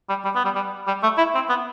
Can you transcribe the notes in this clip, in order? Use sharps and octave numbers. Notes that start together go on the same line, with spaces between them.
G3
G3
B3
G3
G3
G3
A3
E4
C4
B3